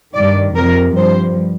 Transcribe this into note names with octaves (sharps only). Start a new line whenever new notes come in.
G2 D#3 D5
F2 C3 F3 A#4
G2 F3 C5